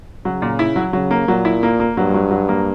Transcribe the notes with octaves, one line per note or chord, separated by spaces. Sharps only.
C#3 F#3
A#2
E4
F#3
C#3 F#3
A#3
A#2 F#3
E4
A#3
A#3
G2 F#3
F#3
F#3
A#3